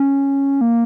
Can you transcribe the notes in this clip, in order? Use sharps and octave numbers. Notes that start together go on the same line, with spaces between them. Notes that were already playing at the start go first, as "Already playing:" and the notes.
Already playing: C#4
A#3